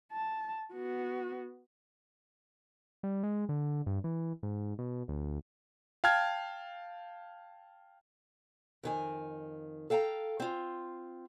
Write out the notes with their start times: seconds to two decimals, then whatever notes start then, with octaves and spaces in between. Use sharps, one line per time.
0.12 A5
0.73 B3 F#4
3.03 G3
3.23 G#3
3.49 D3
3.86 G2
4.04 E3
4.43 G#2
4.79 B2
5.08 D2
6.04 F5 G5 A5 F6 G#6
8.83 F2 D#3 G#5
9.90 A4 F5 G5 G#5 A#5
10.40 C4 F4